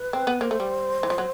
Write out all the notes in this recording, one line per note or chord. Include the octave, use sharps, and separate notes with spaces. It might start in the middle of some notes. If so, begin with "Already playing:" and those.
Already playing: B4
C4
B3
A#3 C5
A3
G3
E3
F3
F#3